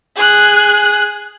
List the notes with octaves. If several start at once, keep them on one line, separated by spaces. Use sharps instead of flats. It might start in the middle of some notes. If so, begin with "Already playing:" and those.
G#4 F#6